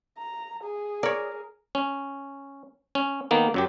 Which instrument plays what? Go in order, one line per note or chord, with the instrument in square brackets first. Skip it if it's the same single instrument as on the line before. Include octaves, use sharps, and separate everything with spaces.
[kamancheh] A#5
G#4
[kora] A#4 [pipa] C#5 D5
[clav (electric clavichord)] C#4
C#4
D#3 A#3 B3
F#2 F#3 G4